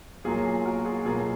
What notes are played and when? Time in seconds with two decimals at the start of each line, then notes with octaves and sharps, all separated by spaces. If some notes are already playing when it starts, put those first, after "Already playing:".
0.24 B1 A#2 F#3 A#3 F4 G#4
0.66 F#4 A#4
0.85 F4 G#4
1.05 B1 B2 F#3 A#3 F4 G#4